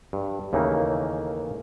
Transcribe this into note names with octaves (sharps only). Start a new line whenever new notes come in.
G2
D#2 C#3 E3 A3 A#3 D#4